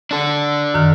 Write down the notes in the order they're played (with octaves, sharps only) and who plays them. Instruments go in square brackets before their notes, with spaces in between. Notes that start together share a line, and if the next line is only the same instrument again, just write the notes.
[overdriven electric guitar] D4 A4
[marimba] F#2 D#3 F6